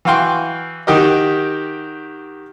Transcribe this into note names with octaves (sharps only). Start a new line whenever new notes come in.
E3 F#4 F5 G5 C6 C#6
D#3 F#4 G4 A#4 D#5